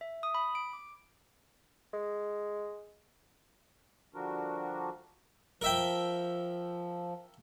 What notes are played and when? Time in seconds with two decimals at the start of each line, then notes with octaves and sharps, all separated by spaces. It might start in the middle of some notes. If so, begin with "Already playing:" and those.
0.01 E5
0.23 D#6
0.34 B5
0.55 D7
0.73 D6
1.94 G#3
4.15 D3 F3 G3 D4 F#4 A#4
5.61 F3 A#4 E5 G5